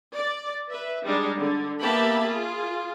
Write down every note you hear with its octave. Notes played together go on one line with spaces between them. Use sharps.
D5
B4 E5
G3 G#3 D4 D#4
D3
A#3 B3 G4 E5 A5 B5
F4 G#4